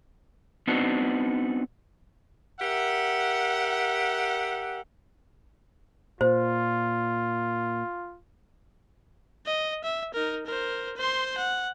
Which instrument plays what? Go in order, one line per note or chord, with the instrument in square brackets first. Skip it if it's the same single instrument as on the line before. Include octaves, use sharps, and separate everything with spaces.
[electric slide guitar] B3 C4 D4 D#4 F#4
[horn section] G4 A#4 E5 F#5
[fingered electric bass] A#2 [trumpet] F4 [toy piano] C5
[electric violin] D#5
E5
D#4 A#4
A#4 C5
C5 C6
F#5